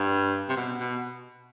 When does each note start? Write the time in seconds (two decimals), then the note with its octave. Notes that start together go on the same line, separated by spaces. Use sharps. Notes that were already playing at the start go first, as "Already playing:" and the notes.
Already playing: G2
0.49 C3
0.57 B2
0.80 B2